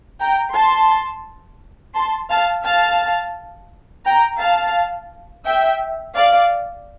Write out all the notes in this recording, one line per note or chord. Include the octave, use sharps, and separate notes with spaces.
G5 A#5
A5 C6
A5 C6
F5 A5
F5 A5
G5 A#5
F5 A5
E5 G5
D5 F5